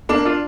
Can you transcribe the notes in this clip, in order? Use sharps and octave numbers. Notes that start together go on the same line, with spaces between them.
A#3 D4
D4 F4